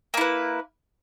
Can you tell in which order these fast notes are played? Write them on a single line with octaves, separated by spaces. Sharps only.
A#3 E4 B4